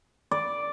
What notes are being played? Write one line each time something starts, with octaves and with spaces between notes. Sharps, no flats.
D5